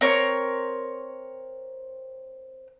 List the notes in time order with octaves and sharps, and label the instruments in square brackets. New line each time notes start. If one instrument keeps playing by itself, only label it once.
[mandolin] C4 A#4 C#5